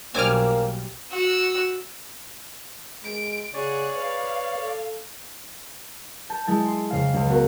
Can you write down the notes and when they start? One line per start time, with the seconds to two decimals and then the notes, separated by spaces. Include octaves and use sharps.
0.15 B1 G3 A#3 C4 D4 G#5 D6 F6
1.11 F#4 E6
3.04 G#3 D7
3.54 C#3 G#4 C#5 D5 F#5
3.96 B4 F5
4.57 A4
6.30 A5 G6
6.47 G#3 E4 A5
6.65 C6
6.90 F2 C#3 F5
7.14 C#2
7.28 B3 F#4 A#4